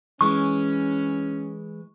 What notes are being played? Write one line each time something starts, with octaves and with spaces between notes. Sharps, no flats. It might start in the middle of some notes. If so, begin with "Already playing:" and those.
E3 G#3 C#4 C#6